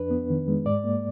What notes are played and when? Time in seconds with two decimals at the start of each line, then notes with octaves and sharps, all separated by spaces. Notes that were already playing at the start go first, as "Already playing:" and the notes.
Already playing: F2 D4 B4
0.11 B3
0.30 D#3
0.48 G#3
0.66 G#2 D5
0.84 A#3